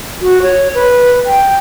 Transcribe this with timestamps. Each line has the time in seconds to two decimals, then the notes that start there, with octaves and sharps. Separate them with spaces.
0.21 F#4
0.42 C#5
0.75 B4
1.26 G5